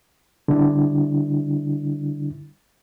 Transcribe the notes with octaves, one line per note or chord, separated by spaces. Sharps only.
D3 G3 D4 E4